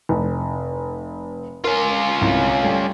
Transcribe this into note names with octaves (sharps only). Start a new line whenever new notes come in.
F1
C#4 F4 A#4
C2
G3 A3